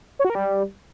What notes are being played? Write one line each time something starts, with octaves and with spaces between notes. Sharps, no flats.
C#5
F#4
A#4
G3